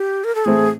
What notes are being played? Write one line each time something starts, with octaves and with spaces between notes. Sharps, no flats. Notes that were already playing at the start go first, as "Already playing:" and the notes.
Already playing: G4
A#4
A4
A2 E3 A3 C4 E4 G#4